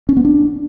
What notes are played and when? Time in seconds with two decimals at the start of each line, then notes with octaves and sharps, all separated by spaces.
0.09 C#4
0.17 B3
0.25 D4